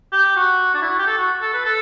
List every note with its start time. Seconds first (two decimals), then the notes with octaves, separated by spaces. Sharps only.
0.12 G4
0.36 F#4
0.74 D4
0.82 E4
0.90 F#4
0.98 G4
1.07 A4
1.18 F#4
1.42 A4
1.54 B4
1.65 A4